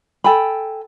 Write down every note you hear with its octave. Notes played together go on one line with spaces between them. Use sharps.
A4 G5 G#5 B5